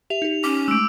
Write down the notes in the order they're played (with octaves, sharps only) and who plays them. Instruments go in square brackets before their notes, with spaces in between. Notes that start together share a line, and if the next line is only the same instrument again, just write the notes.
[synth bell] G4 E5 [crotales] F7
[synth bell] D#4 G4
[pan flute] C#4 [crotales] D6
[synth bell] G#3 A3 [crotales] E6 D7